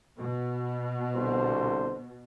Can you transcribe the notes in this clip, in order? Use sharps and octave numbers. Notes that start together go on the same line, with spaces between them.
B2
C2 D3 C5